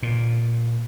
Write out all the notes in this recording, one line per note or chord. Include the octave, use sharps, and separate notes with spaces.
A#2